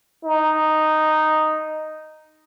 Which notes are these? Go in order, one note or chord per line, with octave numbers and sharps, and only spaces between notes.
D#4